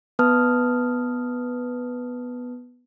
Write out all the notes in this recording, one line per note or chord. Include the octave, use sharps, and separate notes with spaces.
B3 B4 A5 D#6 F6